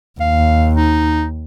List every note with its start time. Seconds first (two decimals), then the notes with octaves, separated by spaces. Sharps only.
0.20 D#2 F5
0.77 D#4